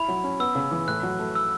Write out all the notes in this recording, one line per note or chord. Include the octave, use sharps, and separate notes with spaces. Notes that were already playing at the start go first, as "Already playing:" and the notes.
Already playing: E4 B5
F#3
C#4
B3 E6
C#3
E3
A2 F#6
F#3
A3
E6